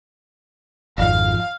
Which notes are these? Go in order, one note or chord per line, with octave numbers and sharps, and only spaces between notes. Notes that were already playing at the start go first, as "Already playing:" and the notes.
G#1 F2 F3 F5